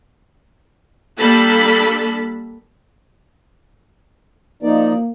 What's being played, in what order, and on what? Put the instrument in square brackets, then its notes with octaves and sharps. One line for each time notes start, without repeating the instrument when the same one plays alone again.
[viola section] G3 A#3 D4 A4 A5 B5
[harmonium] F3 D#4 D5 [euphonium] A#3